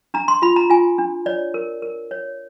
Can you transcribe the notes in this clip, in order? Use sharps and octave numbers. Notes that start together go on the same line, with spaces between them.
D4 A#5
C6
F4 B5
A#5
F4 G#5
D4
C#5 D5
A#4
A#4
C#5